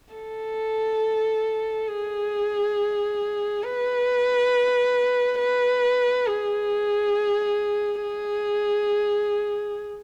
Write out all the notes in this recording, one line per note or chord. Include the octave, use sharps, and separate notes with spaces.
A4
G#4
B4
B4
G#4
G#4